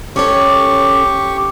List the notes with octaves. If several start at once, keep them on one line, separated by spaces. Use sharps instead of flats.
C#4 G4 A4 C#5 C#6